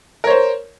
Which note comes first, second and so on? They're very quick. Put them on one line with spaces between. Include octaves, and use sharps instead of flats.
A#4 C#5 C5